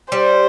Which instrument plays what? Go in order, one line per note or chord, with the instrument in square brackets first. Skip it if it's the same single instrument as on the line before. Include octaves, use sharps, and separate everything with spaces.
[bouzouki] G3 [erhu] C5